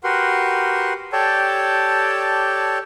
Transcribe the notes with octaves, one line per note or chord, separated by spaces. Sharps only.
F#4 G4 A#4 B4 F#5 C6
G4 A4 C#5 D5 G5 A5